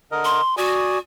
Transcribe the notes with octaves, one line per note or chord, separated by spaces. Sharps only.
D3 A#4 D#5
C6
F#4 D5 G#5 D#6